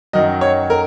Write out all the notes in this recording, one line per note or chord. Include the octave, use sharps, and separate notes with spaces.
F#2 D#3 F#3 D#5
C#5
A#4